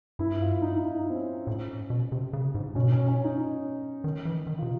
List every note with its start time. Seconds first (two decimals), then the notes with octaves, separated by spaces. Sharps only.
0.19 G2 E4
0.41 F4
0.62 D#4
0.72 E4
0.84 D#4
1.10 C4
1.15 C#4
1.47 A2
1.90 B2
2.12 C3
2.33 C#3
2.55 G#2
2.75 B2 C#4
2.92 C#4
3.08 C#4
3.24 D#4
4.04 D#3
4.25 E3
4.47 D#3
4.58 C3 F4